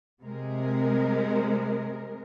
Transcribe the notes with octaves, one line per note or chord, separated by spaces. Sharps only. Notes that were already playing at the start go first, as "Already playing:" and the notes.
C3 G#3 A#4